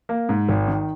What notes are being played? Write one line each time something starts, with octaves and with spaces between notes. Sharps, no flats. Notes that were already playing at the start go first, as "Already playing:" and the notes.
A#3
G#2
G#1
D#3